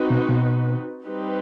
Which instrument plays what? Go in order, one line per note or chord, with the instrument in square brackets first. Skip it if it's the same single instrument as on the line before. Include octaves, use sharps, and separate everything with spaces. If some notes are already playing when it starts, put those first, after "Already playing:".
Already playing: [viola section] C4 D#4 F#4 B4
[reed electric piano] B2
B2
[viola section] G3 C4 D#4 G4 B4